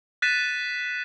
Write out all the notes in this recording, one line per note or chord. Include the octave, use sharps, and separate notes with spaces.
F#6 A6 B6 D#7 E7